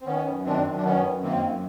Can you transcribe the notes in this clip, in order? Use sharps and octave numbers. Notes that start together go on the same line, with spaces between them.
C4
D#3 B3 C#4
F#2
D#3 C4 D4
F#2
D4
D#3 B3 C#4
F#2
D#3 A#3 C4
F#2